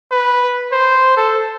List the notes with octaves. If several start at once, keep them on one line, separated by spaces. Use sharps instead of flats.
B4
C5
A4